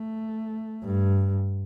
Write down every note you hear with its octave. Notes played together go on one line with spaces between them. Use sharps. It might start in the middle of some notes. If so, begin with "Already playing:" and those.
Already playing: A3
G2